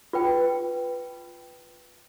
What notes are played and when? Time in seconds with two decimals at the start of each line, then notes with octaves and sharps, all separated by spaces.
0.13 F4 B4 G5